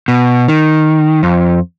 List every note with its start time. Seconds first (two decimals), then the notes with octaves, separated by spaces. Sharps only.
0.08 B2
0.48 D#3
1.23 F2